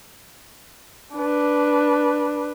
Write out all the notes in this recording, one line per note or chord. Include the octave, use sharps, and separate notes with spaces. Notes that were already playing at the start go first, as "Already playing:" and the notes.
D4 B4